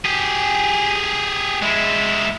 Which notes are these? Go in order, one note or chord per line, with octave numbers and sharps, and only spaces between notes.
G4 G#4
G#3 E4